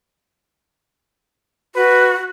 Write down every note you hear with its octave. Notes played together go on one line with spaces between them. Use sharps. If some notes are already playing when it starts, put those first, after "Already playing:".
F#4 B4